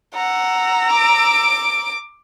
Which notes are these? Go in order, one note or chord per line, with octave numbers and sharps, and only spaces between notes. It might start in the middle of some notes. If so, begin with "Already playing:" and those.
F#5 A#5 E6
D6 D7